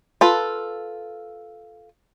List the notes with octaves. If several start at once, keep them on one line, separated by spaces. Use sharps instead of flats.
F4 A4 B4